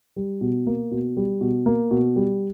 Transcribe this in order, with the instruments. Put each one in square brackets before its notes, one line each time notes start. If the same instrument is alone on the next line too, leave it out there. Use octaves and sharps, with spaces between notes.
[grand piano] G3
B2
A#3
B2
G3
B2
A#3
B2
G3